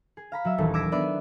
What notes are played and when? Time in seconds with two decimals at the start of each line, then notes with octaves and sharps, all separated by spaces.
0.17 G#4
0.32 F5 A#5 B5
0.45 F#3 E5
0.58 D#1 A#1 E3 A4
0.74 D6 E6 G#6 A#6 B6 D7
0.92 B3 D4 B4 D5 E5